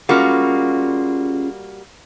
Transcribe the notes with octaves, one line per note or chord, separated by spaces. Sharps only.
G3 A#3 C#4 F4 F#4 G#4